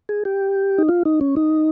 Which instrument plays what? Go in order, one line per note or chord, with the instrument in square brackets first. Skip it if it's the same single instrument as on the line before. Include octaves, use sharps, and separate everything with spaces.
[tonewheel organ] G#4
G4
D#4
F4
D#4
C#4
D#4